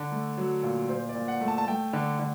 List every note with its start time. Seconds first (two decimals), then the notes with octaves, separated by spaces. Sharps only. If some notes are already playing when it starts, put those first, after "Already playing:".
Already playing: D3
0.12 A3
0.38 F#3
0.63 A#2
0.89 A#2 C5
1.09 D5
1.15 A#2
1.28 F#5
1.41 A3
1.48 A5
1.58 A5
1.67 A3 G5
1.93 D3
2.19 D3